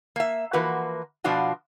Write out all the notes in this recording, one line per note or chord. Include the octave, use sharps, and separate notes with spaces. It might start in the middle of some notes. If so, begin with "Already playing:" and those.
A#3 E5
E3 F3 A#3 F#4 B4
B2 F3 B3 D4 F4 F#4